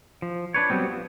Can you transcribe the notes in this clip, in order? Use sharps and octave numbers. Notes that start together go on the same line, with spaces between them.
F3
D4 B4 C#5
F#3 G3 B3 C4
F3